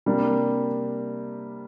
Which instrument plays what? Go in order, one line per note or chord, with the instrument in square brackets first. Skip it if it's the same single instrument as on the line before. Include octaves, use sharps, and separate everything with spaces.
[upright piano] C3 G3 A#3 D4 A#4